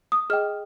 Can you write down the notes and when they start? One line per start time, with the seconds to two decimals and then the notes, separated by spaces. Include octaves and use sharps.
0.12 D#6
0.30 G#4 D#5 G5 F6